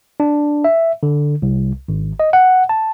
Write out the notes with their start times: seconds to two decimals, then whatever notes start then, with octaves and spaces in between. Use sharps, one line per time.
0.20 D4
0.64 E5
1.03 D3
1.42 C2
1.89 G#1
2.20 D#5
2.33 F#5
2.69 A5